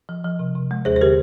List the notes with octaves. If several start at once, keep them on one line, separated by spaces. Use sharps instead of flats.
F3
F3
C3
C3
G#3
D#2 G#4 C5
C5
D3 G4 A#4